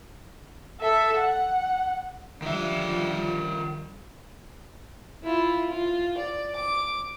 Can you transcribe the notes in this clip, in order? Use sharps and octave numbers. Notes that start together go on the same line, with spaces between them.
A4 E5
F#5
D3 D#3 F3 G3 E5
E4 F4
F4
D5
D6